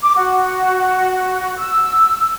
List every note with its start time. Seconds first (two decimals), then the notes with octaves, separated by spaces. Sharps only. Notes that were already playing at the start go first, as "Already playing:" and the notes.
0.02 D6
0.16 F#4
1.58 E6